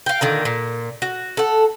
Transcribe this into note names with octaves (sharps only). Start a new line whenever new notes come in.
F5 G5
A#2 D3 D#3
A#2
F#4
A4 F#5